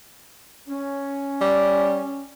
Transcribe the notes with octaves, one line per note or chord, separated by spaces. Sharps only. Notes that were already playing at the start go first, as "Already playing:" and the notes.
C#4
G3